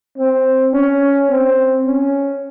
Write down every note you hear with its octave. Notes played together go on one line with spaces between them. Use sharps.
C4
C#4
C4
C#4